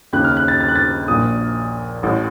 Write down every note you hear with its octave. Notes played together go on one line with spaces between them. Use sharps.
D#2 C#3 F#6
F6
F#6
A6
A6
F#6
A6
A#1 A#2 D#6
A1 A2